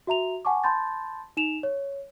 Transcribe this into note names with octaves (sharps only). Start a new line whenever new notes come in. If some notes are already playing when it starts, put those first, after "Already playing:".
F#4 E5 A#5 F7
F#5 G#5 A5 C#6 D6
A5 B5 C6 G6 A6
D#4 E7 F7
C#5